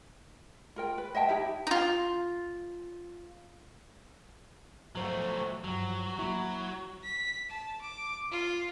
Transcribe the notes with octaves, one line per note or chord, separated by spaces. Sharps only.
F4 A#4 G5
B4
D#5 E5 G5 A5
D#4 E4 G4 E5
D#4 F4
B2 F3 F#3 A3 C5
G2 F3 F#3
F#3 A#3 E4
B6
A5
D6
F4